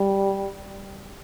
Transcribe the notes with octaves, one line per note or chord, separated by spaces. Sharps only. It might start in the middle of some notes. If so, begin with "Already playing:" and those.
Already playing: G3